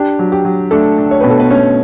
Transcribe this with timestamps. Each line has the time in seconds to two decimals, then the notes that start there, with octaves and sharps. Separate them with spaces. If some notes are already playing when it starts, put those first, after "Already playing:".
Already playing: D4 G4
0.19 F#3
0.32 G4
0.45 F#3
0.71 A3 D4 A4
0.98 D4
1.11 C#5
1.20 B2 B4
1.30 A4
1.40 B3 B4
1.50 A3 C#4 C#5